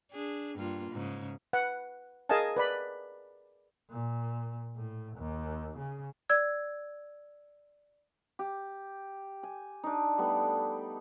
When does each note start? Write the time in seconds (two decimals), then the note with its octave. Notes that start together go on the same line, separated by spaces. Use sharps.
0.11 D4 G#4
0.56 G2 A#3 F4
0.91 G#2 C#3
1.53 B4 F#5
2.29 G#4 A#4 D#5 F5 G#5 A5
2.57 B4 D5 B5
3.90 A#2
4.76 A2
5.17 D#2
5.78 C#3
6.30 D5 E6 G#6
8.39 G4
9.43 G#5
9.84 D4 D#4
10.18 G3 A3 B3